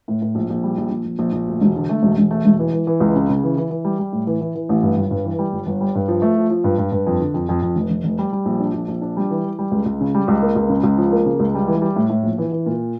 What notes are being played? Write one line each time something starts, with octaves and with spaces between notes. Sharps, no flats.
A2
A2
A#1
A#1
G3
A#1
A#1
A#1
A#1
A#1
D2
E1
D3
A3
E1
E1
A3
E1
E3
E3
E3
C#2
C#3
C#3
E3
E3
E3
G3
G3
A2
E3
E3
E3
A1
G2
G1
G2
E3
G3
G1
G1
G3
G2
F3
A3
F3
F3
G2
G2
G2
F2
D3
F2
F2
F2
F1
F1
F1
G3
G3
A#1
D4
A#1
A#1
D4
G3
E3
E3
G3
C#2
C#2
C#3
G3
C#2
A#3
C#2
C#3
C#2
F3
A#3
C#3
C#2
G3
E3
G3
A2
A2
A#1
E3
E3
A#2